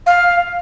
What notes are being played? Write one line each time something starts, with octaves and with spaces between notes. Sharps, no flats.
F5